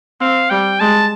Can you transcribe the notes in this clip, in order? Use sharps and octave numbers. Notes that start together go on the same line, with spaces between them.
C4 F5
G3 G5
G#3 A5